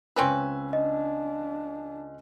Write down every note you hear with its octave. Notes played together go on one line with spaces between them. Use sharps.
C#2 C4 C#4 B4 G#5 E6
D4 D#5